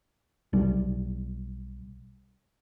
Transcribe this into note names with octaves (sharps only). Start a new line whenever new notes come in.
B1 G3